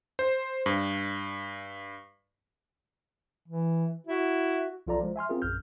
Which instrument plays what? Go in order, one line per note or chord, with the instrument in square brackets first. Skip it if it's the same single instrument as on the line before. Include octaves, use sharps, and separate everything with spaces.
[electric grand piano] C5
G2
[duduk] E3
[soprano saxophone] E4 [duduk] F#4
[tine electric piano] B1 F3 F4 A4 D5 A#5
F3 G#3
E5 G#5 C6 F6
C4 F4 G#4 A#4
A#1 F#2 F6 G6